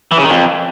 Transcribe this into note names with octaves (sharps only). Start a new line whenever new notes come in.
E3
C#3
D#3
F2